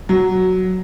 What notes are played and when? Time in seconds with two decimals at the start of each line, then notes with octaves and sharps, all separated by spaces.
0.09 F#3